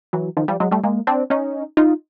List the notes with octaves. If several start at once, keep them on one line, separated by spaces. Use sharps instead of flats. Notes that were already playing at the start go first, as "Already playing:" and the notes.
E3 F#3
D#3 F3
F3 G3
F#3 G#3
G3 A3
G#3 A#3
C4 D4
C#4 D#4
D#4 F4